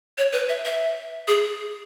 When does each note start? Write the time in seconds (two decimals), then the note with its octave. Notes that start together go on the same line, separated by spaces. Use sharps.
0.18 C#5
0.32 B4
0.49 E5
0.65 E5
1.28 G#4